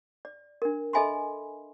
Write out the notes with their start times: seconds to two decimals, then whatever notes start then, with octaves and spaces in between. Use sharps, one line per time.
0.25 D5
0.62 D4 A#4
0.93 A4 D#5 E5 G#5 B5 C6